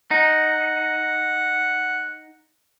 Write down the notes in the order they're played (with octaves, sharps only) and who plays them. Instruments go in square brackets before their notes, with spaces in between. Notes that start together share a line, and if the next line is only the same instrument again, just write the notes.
[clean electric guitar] D#4 [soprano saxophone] F#5